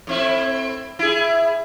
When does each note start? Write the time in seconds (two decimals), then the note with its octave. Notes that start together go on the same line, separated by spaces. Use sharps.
0.07 A2 C4 E4
0.99 E4 G#4